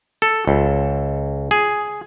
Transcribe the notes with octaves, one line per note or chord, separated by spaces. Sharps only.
A4
C#2
G#4